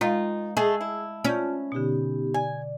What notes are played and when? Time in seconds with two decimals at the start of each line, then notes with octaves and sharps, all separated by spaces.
0.01 D#3 G#3 D#4 F4
0.57 A3 G#4 D#5 A5 E6
0.81 E4
1.24 C#4 F4 D5 A5 G6
1.72 B2 D3 B3 D#4 G4
2.34 D5 G#5